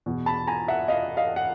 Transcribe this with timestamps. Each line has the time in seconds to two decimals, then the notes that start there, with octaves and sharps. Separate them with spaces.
0.06 E2 B2
0.26 A5 B5
0.47 G#5 A#5
0.68 E5 F#5
0.88 D#5 F5
1.17 D#5 F5
1.36 F#5